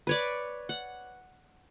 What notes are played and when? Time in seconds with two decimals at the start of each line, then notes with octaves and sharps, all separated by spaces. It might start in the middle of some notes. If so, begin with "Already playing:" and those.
0.07 B4 C#5 D5
0.69 F#5